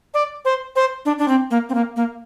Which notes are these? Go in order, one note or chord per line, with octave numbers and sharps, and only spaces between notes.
D5
C5
C5
D4
D4
C4
A#3
C4
A#3
A#3